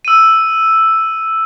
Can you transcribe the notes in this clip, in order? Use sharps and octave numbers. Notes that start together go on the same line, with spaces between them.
E6 D#7